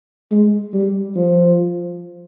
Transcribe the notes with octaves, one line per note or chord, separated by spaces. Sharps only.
G#3
G3
F3